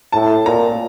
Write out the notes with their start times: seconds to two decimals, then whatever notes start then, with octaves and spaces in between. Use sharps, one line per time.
0.12 A2 A5
0.45 A#2 A#5